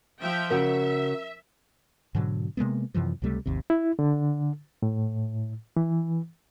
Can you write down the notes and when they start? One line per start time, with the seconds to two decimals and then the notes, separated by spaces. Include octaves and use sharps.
0.21 F3 E5 G5
0.50 C#3 F#4 A#4 C#5 E5
2.15 G#2 B2 D3 F#3
2.57 C3 G#3 A#3 B3
2.95 F#2 C3 E3 F3
3.22 C#2 C3 G3 A3
3.46 G#1 D#2 C3
3.70 E4
3.99 D3
4.83 A2
5.77 E3